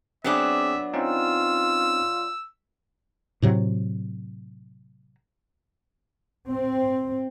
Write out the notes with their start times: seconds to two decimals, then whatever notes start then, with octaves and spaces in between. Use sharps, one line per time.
0.24 F#3 B3 C4 D4 G#4 E5 D6
0.94 C4 C#4 D#4 F4 E6
3.42 A2 C3 F#3
6.48 C4